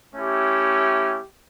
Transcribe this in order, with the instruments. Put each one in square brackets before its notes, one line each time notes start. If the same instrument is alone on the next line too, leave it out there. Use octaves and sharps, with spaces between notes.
[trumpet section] A3 C#4 E4 G4